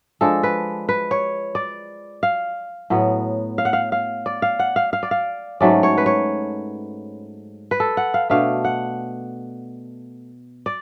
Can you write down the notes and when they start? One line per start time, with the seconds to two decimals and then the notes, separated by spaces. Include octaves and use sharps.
0.21 F3 G#3 D4 A4
0.43 B4
0.89 B4
1.11 C#5
1.55 D5
2.23 F5
2.90 A2 F#3 B3
3.58 F5
3.65 F#5
3.73 F5
3.92 F5
4.26 D5
4.42 F5
4.59 F#5
4.76 F5
4.93 F5
5.03 D5
5.11 F5
5.60 G#2 F#3 A3 C#4 D5
5.83 C#5
5.98 B4
6.06 C#5
7.71 B4
7.80 A4
7.97 F#5
8.14 F5
8.30 B2 A3 D4 F5
8.65 F#5
10.66 D5